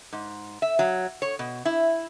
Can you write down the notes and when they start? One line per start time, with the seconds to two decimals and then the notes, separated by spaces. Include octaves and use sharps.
0.12 G#2
0.62 E5
0.79 F#3
1.22 C#5
1.39 B2
1.65 E4